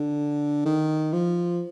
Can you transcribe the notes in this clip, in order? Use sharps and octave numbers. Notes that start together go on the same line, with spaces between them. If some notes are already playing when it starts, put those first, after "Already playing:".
Already playing: D3
D#3
F3